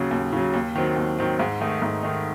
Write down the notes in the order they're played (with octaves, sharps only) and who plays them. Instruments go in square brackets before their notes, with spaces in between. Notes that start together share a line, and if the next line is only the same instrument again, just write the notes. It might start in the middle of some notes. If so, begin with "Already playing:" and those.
Already playing: [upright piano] D#2 C#3 F#3
D#2
C#3 F#3
D#2
D#3 F#3 C4
D#2
D#3 F#3 C4
G#2
D#3 A3 D#4
G#2
D#3 A3 D#4